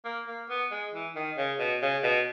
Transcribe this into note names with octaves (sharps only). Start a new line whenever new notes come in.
A#3
A#3
B3
G#3
E3
D#3
C#3
B2
C#3
B2